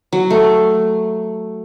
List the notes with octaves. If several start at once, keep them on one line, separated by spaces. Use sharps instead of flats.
F#3
A3